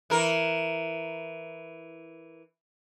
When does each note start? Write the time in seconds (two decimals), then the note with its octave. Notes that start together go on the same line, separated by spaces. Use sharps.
0.10 E3 A#4